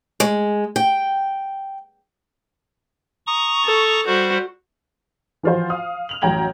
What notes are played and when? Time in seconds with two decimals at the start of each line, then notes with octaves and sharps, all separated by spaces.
0.20 G#3
0.76 G5
3.27 A#5 C#6 D#6
3.65 A4
4.07 G3 F#4 C5
5.43 E3 F3 F4 F#4 C5
5.70 F5 D#6
6.09 F6 F7 F#7
6.22 A1 F#2 G5 A#5 G#6 F#7